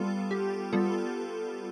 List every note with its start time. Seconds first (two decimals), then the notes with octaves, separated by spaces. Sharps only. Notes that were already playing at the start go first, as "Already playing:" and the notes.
Already playing: G3 B3 F4 A4
0.31 G4
0.73 G3 B3 F4 A4